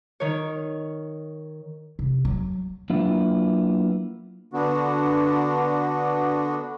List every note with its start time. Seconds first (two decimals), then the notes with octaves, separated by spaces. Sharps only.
0.20 D#3 C#5
1.99 C3
2.25 F#3
2.90 F#3 A#3 B3 D4 E4 F4
4.53 D3 B3 D4 F#4